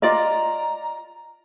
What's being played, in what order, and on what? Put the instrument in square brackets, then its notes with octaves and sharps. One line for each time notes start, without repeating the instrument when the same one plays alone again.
[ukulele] F4 D5 D#5 [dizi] A#5